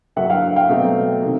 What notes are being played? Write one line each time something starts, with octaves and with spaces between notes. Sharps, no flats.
G2 D3 F#3 A#3 E5 F#5
F5 G5
F5 G5
B2 F#3 A3 C4
C3 D#3